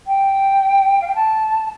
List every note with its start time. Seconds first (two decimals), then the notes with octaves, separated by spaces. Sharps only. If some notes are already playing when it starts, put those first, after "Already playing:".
0.07 G5
1.01 F5
1.07 G5
1.15 A5